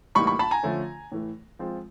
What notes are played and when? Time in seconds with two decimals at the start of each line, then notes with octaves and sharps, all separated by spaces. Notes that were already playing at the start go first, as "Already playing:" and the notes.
0.15 A2 E3 G3 A#3 D#4 B5 C#6
0.27 B5 C#6
0.39 A5 B5
0.51 G#5 A#5
0.63 D3 F3 A3 C#4
1.12 A2 E3 A3
1.59 F3 G#3 C4 F4